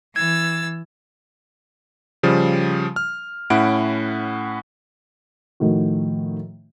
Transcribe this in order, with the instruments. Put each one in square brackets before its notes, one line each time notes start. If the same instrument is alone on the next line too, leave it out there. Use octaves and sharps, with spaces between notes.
[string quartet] E3 E6 A6 [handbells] G#6
[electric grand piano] C#3 F3 G3
F6
A2 C#4 E4 F#5 D7
[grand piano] A2 D#3 F3 F#4